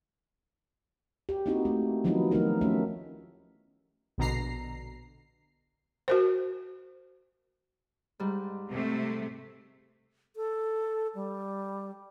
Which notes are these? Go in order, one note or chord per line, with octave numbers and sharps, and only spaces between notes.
G4
A#3 C4 D#4 E4 F#4 G4
A3
D#3 F3 F#3 B3 D#4 E4
D#3 F#3 A3 B3 D#4 A#4
A3 C#4 E5
A#1 B2 D3 A#5 C7
F#4 A#4 C5
G#2 G3
C3 A3
A4
G3